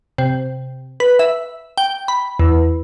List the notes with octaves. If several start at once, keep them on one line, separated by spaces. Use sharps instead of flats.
C3
B4
E5
G5
B5
E2